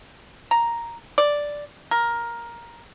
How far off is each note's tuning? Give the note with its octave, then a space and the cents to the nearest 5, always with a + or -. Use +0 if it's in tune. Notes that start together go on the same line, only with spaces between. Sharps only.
A#5 +0
D5 +0
A#4 +10